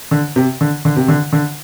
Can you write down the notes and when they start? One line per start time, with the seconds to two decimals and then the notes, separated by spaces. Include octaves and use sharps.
0.11 D3
0.36 C3
0.61 D3
0.85 D3
0.96 C3
1.08 D3
1.33 D3